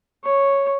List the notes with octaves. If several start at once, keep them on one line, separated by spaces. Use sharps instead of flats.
C#5